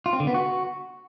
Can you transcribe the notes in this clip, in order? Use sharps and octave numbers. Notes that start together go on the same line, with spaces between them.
F4
C4
D3
B3
F#4